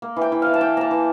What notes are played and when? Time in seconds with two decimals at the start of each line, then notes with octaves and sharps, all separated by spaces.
0.02 A#3
0.16 E3
0.22 G5
0.32 E3
0.42 E3 F5
0.54 A5
0.61 E3 G5
0.77 A#3 A5 A#5
0.91 E3